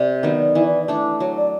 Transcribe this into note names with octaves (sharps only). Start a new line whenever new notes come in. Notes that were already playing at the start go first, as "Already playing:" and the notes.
Already playing: C3 D5
D#3 F#3 B3
E3
A3 D4
F#3 C#5
D5